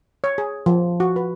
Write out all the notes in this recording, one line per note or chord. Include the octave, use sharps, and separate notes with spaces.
C#5
G#4
F3
F#4
B4